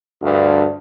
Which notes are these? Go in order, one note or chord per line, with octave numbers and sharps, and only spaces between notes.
D2 G2